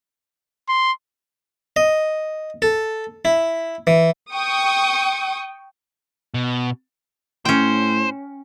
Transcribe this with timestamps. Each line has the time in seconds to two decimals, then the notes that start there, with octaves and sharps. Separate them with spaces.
0.69 C6
1.76 D#5
2.62 A4
3.25 E4
3.87 E3
4.32 G5 C#6 D#6
6.34 B2
7.45 A2 C#4 C5 G5